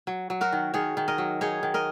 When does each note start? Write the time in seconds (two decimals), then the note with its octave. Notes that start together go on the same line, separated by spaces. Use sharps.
0.07 F#3
0.30 F#3
0.41 F#4 A#4
0.52 D#3
0.74 D#3 G#4 C#5
0.97 D#3
1.08 A#4 D#5
1.18 F#3
1.41 D#4 G#4 C#5
1.63 D#3
1.74 A#4 D#5